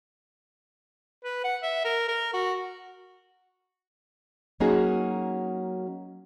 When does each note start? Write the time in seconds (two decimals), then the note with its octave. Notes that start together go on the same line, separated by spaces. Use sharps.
1.24 B4
1.44 F#5
1.63 E5
1.85 A#4
2.08 A#4
2.34 F#4
4.60 F#3 A#3 C#4 D#4 F#4 G#4